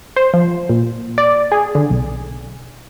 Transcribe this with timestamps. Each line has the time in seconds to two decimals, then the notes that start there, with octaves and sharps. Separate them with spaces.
0.16 C5
0.34 F3
0.69 A#2
1.18 D5
1.52 G#4
1.75 D3
1.90 B1